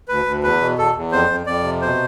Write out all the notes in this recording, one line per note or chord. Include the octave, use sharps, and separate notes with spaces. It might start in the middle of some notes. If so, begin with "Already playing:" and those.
D2 B4
D2
E2 B4
B2
E2 A4
E2
F2 C5
F2
F2 D5
C3
B2 C5